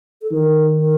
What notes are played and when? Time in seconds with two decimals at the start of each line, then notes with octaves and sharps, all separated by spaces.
0.22 A4
0.32 D#3 A#4
0.80 A#4